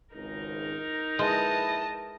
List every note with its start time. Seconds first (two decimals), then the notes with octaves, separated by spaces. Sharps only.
0.15 G#1 C#2 D#4 A#4
1.19 A#1 G#3 E4 B4 D#5 A5